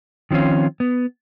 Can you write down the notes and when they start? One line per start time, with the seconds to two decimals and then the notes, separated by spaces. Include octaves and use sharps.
0.31 D#3 F3 C4 C#4 F4
0.80 B3